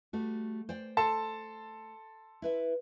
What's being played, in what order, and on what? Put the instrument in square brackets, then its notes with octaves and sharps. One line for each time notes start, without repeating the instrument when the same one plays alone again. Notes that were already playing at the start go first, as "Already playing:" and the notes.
[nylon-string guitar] G3 A3 F#4
C5 D5 G5
[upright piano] A4 A5 C6
[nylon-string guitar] E4 B4 E5